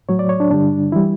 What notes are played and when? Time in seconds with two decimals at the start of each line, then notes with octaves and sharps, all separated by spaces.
0.09 A2 F#3 C#5
0.19 D5
0.29 C#5
0.40 D4
0.50 G2 D3 G3 D4
0.92 E3 G3 E4